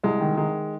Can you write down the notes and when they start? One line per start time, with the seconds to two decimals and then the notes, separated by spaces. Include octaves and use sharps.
0.04 C2 G#3
0.21 D#3
0.37 D#3 G#3